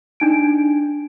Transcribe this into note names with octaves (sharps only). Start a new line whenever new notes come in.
D4 D#4 D7